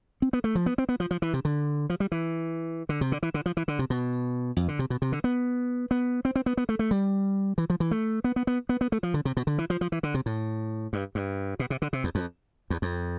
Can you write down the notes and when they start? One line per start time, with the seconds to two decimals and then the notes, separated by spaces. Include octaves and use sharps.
0.22 C4
0.33 B3
0.44 A3
0.55 F3
0.66 B3
0.78 C4
0.89 B3
1.00 F3
1.11 F3
1.22 E3
1.34 C3
1.45 D3
1.90 F3
2.00 G3
2.12 E3
2.89 D3
3.01 C3
3.12 D3
3.23 E3
3.34 D3
3.46 F3
3.57 E3
3.68 D3
3.79 C3
3.90 B2
4.57 F2
4.68 D3
4.79 C3
4.90 B2
5.02 C3
5.12 D3
5.24 B3
5.91 B3
6.25 C4
6.36 C4
6.46 B3
6.57 B3
6.69 A3
6.79 A3
6.91 G3
7.58 E3
7.70 F3
7.80 E3
7.91 A3
8.24 B3
8.36 B3
8.47 B3
8.69 B3
8.81 B3
8.92 A3
9.03 F3
9.14 D3
9.25 C3
9.37 B2
9.47 D3
9.58 E3
9.70 F3
9.81 F3
9.92 E3
10.03 D3
10.14 C3
10.26 A2
10.93 G2
11.15 G2
11.59 B2
11.70 C3
11.82 D3
11.93 C3
12.04 E2
12.15 F2
12.70 E2
12.82 F2